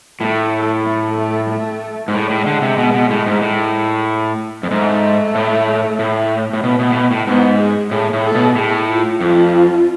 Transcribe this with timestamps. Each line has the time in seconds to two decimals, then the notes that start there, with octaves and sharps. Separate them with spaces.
0.21 A2 A3
0.85 A3
1.18 A3
1.50 A3
2.08 G#2
2.14 A2 G#3
2.30 A2
2.46 D3
2.62 C3
2.78 B2
2.94 B2
3.10 A2
3.26 G#2
3.42 A2
4.63 F2
4.71 G#2 A3
5.35 A2
5.99 A2
6.53 A2
6.63 B2
6.79 B2
6.91 A2
6.95 B2
7.11 A2
7.27 G#2 B3
7.60 G#4
7.91 A2 G#4
8.13 A2
8.24 A4
8.35 B2
8.55 A2 G#4
8.88 F4
9.20 F2 F4